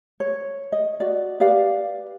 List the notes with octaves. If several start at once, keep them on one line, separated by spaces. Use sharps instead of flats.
C#5
D#5
F#4 D5
G4 B4 D5 F5